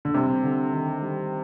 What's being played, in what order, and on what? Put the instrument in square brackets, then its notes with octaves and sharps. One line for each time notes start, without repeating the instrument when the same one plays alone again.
[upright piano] D3
[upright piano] C3 [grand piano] G3
[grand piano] D3
D#3
G3